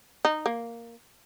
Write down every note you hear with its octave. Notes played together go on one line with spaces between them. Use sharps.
D#4
A#3